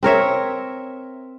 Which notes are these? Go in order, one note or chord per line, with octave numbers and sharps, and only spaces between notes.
C4 A#4 C#5 E5